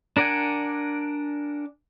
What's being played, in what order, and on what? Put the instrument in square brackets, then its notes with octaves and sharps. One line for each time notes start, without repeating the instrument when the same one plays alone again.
[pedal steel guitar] D4 A#4 D5 F#5 G#5